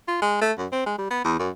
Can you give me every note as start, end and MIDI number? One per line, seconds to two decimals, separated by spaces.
0.08 0.19 65
0.22 0.41 56
0.42 0.52 57
0.58 0.67 42
0.72 0.85 60
0.86 0.97 56
0.98 1.08 55
1.11 1.22 59
1.25 1.35 40
1.39 1.50 42